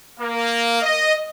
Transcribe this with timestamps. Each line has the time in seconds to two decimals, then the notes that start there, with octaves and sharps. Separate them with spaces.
0.19 A#3
0.82 D#5